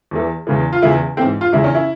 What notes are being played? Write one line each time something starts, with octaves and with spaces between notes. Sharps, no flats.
E2 E3
E2 C#3 E3
F4
E2 C#3 E3 E4
G#2 E3 C4
F4
E2 C#3 E3 E4
C#4
E4